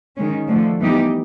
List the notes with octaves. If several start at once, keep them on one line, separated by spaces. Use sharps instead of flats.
D#3 G#3 C#4
D3 F3 A3
E3 G3 B3 D#4 G4